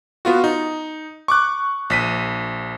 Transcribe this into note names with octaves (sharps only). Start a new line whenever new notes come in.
B3 F4 F#4
D#4
C#6 D6 F#6
A#1 B6 D#7